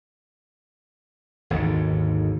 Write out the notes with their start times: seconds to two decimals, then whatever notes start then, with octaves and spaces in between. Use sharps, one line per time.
1.50 G#1 D#2 G#2 D3